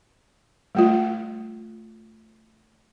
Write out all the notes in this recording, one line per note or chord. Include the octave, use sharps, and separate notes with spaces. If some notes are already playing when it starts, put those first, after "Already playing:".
G3 A3 F4